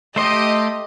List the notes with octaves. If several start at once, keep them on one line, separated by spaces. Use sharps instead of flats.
A3 G4 D#5 C6 D#6